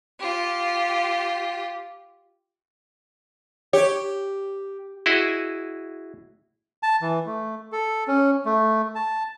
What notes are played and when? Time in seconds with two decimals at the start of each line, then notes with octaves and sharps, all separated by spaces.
0.19 F4 G4
3.73 G4 C#5
5.06 E4 F#4 G#4 D#5
6.83 A5
7.02 E3
7.26 A3
7.72 A4
8.08 C#4
8.46 A3
8.95 A5